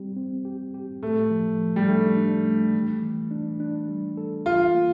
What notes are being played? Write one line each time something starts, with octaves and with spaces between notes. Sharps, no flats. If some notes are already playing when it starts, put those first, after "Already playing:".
Already playing: G3 C4 G4
C4
G4
G4
A2 A3
F3
F3
G3
A3 D4
D4
A3
E3
E3
D4
D4
G3
A4
E3 F4
A#3